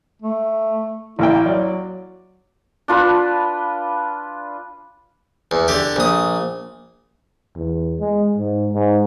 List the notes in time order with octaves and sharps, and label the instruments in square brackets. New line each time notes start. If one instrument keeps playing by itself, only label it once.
[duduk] A3
[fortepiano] A1 A#3 G5 [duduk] E4
[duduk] F#3 [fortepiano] D5
[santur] D4 F4 B4
[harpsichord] E2
D3 G4
A#1 D#6
[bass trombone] E2
G#3
G#2
G#2